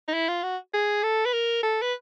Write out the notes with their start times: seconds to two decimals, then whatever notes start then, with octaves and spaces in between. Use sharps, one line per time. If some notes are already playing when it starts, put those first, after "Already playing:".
0.08 D#4
0.14 E4
0.28 F4
0.43 F#4
0.74 G#4
1.03 A4
1.25 B4
1.34 A#4
1.63 A4
1.82 B4